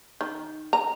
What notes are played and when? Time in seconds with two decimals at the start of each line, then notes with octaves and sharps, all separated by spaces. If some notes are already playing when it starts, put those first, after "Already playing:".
0.21 D#3
0.73 A#5